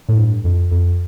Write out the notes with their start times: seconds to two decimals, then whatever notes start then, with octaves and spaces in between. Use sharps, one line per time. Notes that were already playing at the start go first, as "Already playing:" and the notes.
0.09 A2
0.17 G2
0.44 F2
0.72 F2